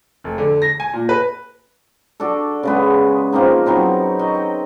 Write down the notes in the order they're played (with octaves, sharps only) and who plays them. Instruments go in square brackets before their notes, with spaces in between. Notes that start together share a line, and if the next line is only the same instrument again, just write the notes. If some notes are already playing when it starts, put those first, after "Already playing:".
[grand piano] F1
D3
A#6
G#5
A#2
B4
[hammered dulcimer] D4 F#4 A4
C#3 G#3 B3
F3 A#3 C4 D#4
D#3 F#3 B3 C4
F#4 D#5
G5